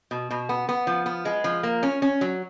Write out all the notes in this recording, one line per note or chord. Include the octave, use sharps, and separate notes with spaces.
B2
B2
B3
B3
F3
B3
G#3
F3
A#3
C#4
C#4
F#3